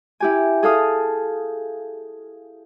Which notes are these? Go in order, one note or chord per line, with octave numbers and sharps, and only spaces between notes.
E4 G4 G#5
G#4 A4 F5 D#6